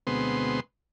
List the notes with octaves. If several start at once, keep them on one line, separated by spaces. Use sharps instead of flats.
D2 B2 G#3 B3 C4 C6